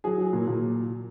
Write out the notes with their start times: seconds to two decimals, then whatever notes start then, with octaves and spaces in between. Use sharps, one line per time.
0.04 F#3 G#4
0.18 F#3
0.33 A#2
0.47 A#2